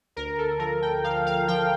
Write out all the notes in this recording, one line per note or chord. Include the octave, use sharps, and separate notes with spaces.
D2 A#4
A4
F3 A#4
G5
F3 F5
F5
F3 G5